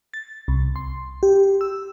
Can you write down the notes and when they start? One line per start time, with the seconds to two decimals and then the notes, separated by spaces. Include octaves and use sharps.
0.14 A6
0.48 C2
0.76 C6
1.23 G4
1.61 E6